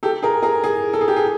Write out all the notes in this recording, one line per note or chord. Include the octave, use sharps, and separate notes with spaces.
G4 A4
G#4 A#4
G#4 A#4
G#4
A4
G#4
G4
G#4